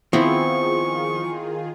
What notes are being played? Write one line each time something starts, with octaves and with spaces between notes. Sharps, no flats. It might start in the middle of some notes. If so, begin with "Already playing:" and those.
D#3 F3 B3 C4 E4 F4 G#4 C#6